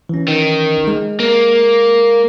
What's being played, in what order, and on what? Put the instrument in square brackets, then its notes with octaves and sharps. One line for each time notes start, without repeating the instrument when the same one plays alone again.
[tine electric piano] E3 C#4
[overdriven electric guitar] D#3
[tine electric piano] G#3
[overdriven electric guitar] A#3